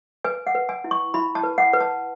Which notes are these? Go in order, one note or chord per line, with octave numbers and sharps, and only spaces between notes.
B4 G#5
F#5
B4
G#5
E4
C#6
E4 B5
A5
B4
F#5
B4
A5